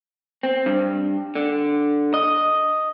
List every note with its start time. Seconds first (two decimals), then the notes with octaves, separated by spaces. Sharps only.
0.43 C4
0.66 G2
1.35 D3
2.14 D#5